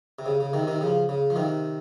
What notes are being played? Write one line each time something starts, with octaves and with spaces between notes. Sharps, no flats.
C3
C#3
C#3
C3 D#3
C3 D#3
C#3 F3
C#3
F3
C3 D#3